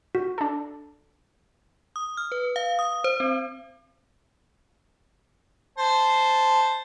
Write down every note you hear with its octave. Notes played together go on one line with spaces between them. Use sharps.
F#4
D4 A4
D#6
F6
B4
F5
D#6
C5
C4
C5 A5